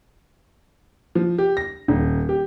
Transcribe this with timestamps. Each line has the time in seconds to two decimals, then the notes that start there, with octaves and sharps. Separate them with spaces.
1.15 F3
1.38 G4
1.57 A#6
1.88 D#1
2.29 G4